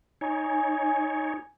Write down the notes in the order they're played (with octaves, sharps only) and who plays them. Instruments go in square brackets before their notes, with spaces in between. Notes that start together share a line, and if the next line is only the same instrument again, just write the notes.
[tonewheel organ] D#4 C#5 [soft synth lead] G#5